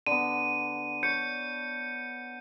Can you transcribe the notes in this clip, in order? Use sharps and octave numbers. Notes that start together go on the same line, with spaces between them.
D3 B3 D#7
C#5 G6 C#7